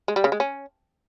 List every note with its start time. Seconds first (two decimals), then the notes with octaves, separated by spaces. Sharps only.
0.08 G#3
0.16 G3
0.24 C#3
0.32 G#3
0.40 C#4